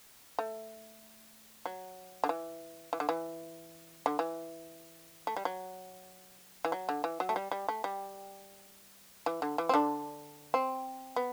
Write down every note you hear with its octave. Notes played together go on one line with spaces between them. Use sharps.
A3
F#3
D3
E3
E3
D3
E3
D3
E3
A3
G3
F#3
E3
F#3
D3
E3
F#3
A3
G3
G3
A3
G3
E3
D3
E3
C4
D3 D4
C4
B3